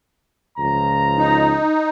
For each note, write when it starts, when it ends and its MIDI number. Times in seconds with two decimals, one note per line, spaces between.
0.59 1.61 37
0.59 1.61 53
0.59 1.61 82
1.19 1.90 63